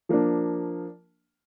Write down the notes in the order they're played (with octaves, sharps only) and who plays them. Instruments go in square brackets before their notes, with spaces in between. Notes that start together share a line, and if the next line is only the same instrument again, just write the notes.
[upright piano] F3 A#3 D4